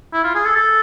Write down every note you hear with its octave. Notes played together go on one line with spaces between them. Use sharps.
E4
F4
G#4
A4
A4